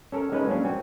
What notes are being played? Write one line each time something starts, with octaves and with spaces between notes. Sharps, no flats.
C#4 A4 A#4
G#3 C#4 D#4 B4 C5 D#5
F#3 A#3 C#4 D4
C4 F#4 G#5